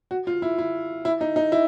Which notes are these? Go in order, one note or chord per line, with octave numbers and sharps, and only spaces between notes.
F#4
F4
E4
E4
E4
D#4
D#4
E4